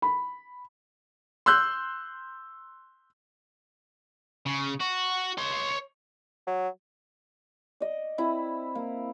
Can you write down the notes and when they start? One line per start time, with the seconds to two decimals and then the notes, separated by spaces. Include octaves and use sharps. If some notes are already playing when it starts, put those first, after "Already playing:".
0.02 B5
1.46 C6 E6 F#6 G6
4.46 C#3
4.81 F#4
5.38 C#5 C6
6.47 F#3
7.80 D5 D#5
8.18 C4 E4 E5 B5
8.75 A#3